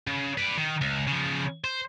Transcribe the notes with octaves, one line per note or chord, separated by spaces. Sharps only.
C#3
B4 D5
D#3
C#2
C#3 F3
C5